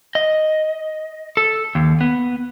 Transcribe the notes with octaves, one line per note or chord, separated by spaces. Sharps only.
D#5
A4
D#2
B3